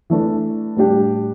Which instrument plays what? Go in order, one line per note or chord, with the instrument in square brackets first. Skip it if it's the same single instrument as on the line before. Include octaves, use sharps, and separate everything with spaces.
[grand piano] E3 A3 D4 A4
A2 G3 D4 G4